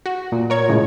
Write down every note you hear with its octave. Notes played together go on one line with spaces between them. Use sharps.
F#4
A#2
A#4 C#5 G#6
A2 C#3 G#3